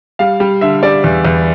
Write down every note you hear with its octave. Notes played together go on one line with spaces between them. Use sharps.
G3 F5
G3
D3 E5
G3 D5
E2
E2